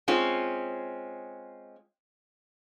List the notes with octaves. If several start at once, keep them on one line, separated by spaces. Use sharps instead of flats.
G#3 C4 C#4 F4